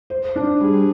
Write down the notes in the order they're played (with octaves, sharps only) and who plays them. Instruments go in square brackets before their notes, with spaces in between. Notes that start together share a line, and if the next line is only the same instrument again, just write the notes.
[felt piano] C5
D4
[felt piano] G3 [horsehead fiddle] G#4